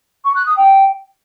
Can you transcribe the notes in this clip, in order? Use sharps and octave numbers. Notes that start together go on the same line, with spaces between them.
C#6
F#6
D#6
G5